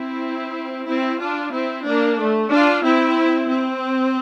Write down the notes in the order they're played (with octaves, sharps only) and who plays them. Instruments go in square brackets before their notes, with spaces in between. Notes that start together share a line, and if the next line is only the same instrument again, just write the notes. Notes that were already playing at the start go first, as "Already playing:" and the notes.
Already playing: [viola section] C4 E4
C4 E4
D4 F4
C4 E4
A#3 D4
A3
D4 F4
C4 E4
C4